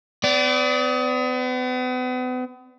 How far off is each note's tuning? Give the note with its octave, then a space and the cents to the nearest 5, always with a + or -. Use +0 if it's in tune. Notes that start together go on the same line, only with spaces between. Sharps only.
B3 +40 D5 -20